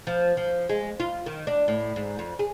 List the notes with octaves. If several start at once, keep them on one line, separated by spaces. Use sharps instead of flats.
F3
F3
G#3
F4
D#3
D4
A2
G#2
F2
G#4